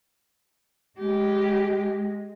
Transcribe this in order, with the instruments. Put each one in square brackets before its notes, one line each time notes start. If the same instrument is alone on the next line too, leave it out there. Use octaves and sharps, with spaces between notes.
[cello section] G#3 [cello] G4